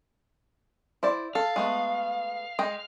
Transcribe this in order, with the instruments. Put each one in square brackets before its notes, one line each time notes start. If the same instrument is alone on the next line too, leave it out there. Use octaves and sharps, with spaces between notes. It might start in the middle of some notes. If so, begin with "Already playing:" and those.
[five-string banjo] E4 C5 D5
[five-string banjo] A4 [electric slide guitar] F5
[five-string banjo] G#3 A3 B3
G#3 D#5 G5